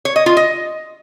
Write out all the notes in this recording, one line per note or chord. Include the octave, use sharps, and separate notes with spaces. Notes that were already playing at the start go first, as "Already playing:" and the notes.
C#5
D#5
F4
D#5